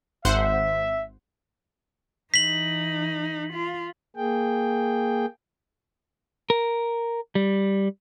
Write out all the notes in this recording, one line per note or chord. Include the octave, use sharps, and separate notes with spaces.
G#1 C5 E5 F#5
E3 D#4 B6 F#7
F4
A#3 G#4 G5
A#4
G3